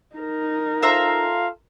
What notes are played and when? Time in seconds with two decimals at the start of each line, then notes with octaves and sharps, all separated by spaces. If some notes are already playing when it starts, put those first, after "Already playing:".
0.16 D#4 A#4
0.83 F4 A4 C5 E5 F5 A#5